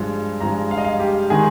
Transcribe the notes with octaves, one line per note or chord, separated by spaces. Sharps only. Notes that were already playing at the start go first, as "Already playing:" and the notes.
Already playing: G2 F3 G#3
G2 F3 G#3 A#5
F5
D#5
F5
G4
D#3 G#3 G#4